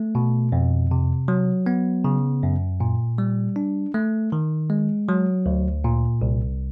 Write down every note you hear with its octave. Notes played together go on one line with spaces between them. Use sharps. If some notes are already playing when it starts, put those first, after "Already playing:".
Already playing: A3
B2
F2
C3
F#3
B3
C#3
F#2
A#2
G3
D4
A3
D#3
G#3
F#3
D2
A#2
C2